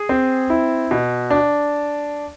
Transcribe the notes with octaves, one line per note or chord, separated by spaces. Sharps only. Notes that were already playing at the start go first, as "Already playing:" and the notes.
Already playing: G#4
C4
E4
B2
D4